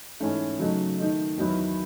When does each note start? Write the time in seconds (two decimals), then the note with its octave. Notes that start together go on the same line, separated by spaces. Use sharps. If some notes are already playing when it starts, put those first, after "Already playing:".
0.20 G#2 E3 A3 C#4 E4
0.59 C#3 F#3 A3 D#4
0.98 D#3 A3 D#4
1.37 E2 D#3 F#3 B3 E4